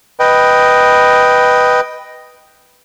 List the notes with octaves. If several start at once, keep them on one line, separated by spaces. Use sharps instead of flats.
B4 D#5 G5